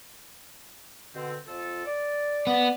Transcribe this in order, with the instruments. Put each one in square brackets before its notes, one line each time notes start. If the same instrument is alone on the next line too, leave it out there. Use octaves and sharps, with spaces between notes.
[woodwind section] B2 D3 C4
F2 F4 A4
D5
[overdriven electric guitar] B3